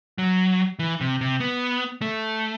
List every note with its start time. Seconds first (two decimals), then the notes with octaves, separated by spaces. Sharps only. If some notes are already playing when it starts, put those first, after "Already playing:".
0.18 F#3
0.79 E3
1.01 C3
1.21 C3
1.40 B3
2.02 A3